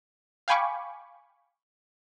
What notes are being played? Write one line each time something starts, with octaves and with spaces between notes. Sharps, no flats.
F5 G5 G#5 B5 C#6 D6